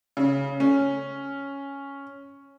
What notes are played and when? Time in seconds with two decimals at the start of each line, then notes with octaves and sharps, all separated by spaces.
0.17 C#3
0.60 C#4